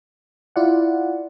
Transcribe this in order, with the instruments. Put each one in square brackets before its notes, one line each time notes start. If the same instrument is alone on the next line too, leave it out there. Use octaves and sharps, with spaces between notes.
[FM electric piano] E4 F4 D5 F#5